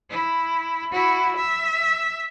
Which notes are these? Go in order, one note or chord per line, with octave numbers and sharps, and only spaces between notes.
E4
E4 F#4
E5